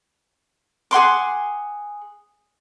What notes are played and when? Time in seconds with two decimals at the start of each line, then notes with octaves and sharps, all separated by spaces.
0.91 G#4 F#5 C6 D6